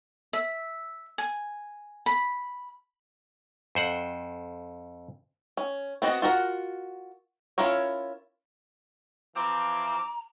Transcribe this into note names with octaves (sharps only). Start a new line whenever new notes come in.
E5
G#5
B5
F2 C5 F#5
C#4
B3 C4 F#4 D#5
F4 F#4 A#4 F#5
C#4 E4 F4 A#4 C#5
E3 F3 C4 A#5 D6